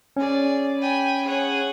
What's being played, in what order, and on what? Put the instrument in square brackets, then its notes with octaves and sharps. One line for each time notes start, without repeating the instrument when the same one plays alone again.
[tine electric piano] C#4 [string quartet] G#4 D5
[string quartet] G5 G#5 B5
G#4 C#5 F#5